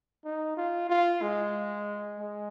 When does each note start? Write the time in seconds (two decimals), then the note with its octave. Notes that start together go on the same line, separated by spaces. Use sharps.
0.25 D#4
0.57 F4
0.89 F4
1.22 G#3
2.20 G#3